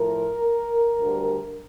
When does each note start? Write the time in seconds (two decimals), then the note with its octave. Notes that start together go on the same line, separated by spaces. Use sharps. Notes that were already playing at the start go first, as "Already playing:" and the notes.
Already playing: A2 F3 A#4
0.99 D2 D3 G3